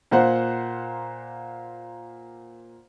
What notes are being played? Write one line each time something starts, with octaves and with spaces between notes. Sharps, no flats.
A#2 A#3 C5 F#5